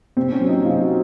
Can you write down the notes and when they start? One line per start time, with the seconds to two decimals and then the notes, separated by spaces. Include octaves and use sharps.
0.17 C3 C4
0.32 C#4
0.40 F#3
0.49 D#4
0.65 C3 F4
0.81 F#4